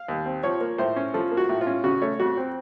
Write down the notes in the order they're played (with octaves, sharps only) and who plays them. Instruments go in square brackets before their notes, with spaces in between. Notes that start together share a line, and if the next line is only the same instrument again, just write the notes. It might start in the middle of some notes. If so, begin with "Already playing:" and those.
Already playing: [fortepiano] F5
D#2
C4
F3 C#5
A#3
A2 C5
C#4
F3 A4
A#3
F#4
A2
F4
C#4
C#3 F#4
A3 C#5
F2 F#4
C4